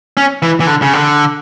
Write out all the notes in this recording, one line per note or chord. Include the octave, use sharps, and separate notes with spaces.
C#4
E3
E3
D3
C#3
D3